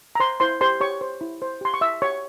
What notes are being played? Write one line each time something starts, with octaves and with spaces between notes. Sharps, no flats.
A#5
C5 C6
E4 C5 C6
G4 C5 C6
G4 C#5 C#6
C5
E4
C5
G4 C6
C#6
E4 E5 E6
G4 C#5 C#6